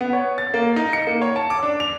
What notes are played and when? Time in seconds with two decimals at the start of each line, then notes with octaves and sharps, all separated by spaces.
0.01 B3
0.13 C#5
0.38 A6
0.54 A#3
0.76 D#4
0.93 C#7
1.07 A#3
1.22 C#5
1.36 A5
1.50 D6
1.63 D4
1.80 F7